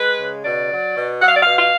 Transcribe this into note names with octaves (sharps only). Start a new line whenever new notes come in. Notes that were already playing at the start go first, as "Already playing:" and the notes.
Already playing: G#3 B4
C#3
B2 D5
F#3
B2
F#3 F#5
F5
D5
B2 F5
F5